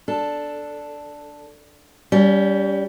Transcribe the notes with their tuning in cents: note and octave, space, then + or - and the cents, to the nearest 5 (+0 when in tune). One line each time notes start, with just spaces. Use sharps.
D4 +0 A4 +0
G3 +0 C#4 +35